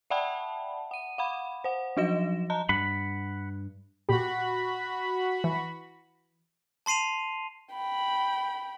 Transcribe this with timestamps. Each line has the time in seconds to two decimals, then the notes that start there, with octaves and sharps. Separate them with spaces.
0.10 D5 E5 F#5 G5 A5 B5
0.91 F#5 D#7
1.18 F5 F#5 B5
1.64 C5 F#5
1.97 F3 F#3 F#4 D#5 A#6 E7
2.50 D#5 A5 A#5
2.69 G2 F#5 B5
4.09 A#2 F#4 G4 B5
5.44 E3
6.86 A5 C6 C7 D#7 F7
7.73 G5 B5